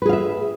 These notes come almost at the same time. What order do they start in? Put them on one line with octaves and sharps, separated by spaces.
B4 G#4 F5 E5